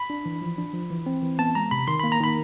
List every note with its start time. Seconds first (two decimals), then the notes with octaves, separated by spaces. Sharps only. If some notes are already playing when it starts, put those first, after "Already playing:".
Already playing: B5
0.10 D4
0.26 E3
0.42 F3
0.58 D4
0.74 F3
0.91 E3
1.06 C4
1.23 E3
1.39 B3 A5
1.55 G#3 A#5
1.71 C3 B5
1.87 D#3 C6
2.00 A#3 B5
2.12 A#5
2.20 D#3 B5